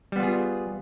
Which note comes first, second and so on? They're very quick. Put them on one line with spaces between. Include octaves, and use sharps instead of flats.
G3 B3 F4 G#4